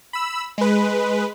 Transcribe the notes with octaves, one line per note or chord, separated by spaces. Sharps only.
B5 E6
G#3 B4